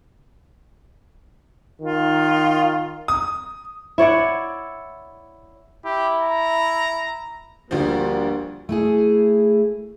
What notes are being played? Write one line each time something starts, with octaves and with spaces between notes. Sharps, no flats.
D#3 F4
D#6
E4 C#5 D5 F#5
E4 G4
A#5
D2 F3 G3 A#3 F#4
A3 E4 G#4